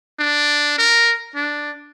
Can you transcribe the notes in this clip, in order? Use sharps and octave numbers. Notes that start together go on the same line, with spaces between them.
D4
A#4
D4